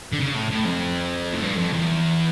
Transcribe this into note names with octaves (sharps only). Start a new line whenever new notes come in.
D3
C#3
A2
A2
F2
A2
G2
F2
E2